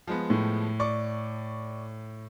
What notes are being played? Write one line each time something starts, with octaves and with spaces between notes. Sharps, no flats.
F3 G#3 B3
A2
D5 C#6 D6